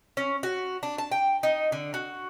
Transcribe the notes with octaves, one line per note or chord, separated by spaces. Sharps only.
C#4
F#4
D4
A5
G5
D#4
D3
F#4